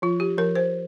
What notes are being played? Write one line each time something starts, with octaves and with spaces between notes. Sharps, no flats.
F3 F4
G4
F3 A#4
C5